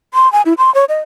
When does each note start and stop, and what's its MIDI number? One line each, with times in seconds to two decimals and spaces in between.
0.14 0.31 84
0.32 0.42 80
0.46 0.54 64
0.58 0.73 84
0.75 0.85 73
0.89 1.00 75